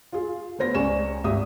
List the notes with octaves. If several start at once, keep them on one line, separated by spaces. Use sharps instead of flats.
F4 G#4
A3 B3 C5 A#6
C#2 C#4 D5 G#5 C#6 E7
G#1 G4 E5 D#6